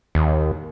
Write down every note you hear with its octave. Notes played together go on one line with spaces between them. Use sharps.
D#2